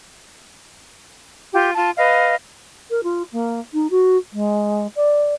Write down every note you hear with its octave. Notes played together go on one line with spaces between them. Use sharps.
F4 G4
F4 A5
B4 D#5 F5
A#4
F4
A#3
D#4
F#4
G#3
D5